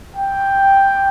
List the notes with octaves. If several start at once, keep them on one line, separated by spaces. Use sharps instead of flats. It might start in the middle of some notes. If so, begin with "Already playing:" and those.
G5